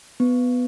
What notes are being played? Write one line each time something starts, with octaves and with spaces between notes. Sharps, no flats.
B3